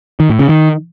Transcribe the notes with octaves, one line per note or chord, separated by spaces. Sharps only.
D#3
A2
C#3
D#3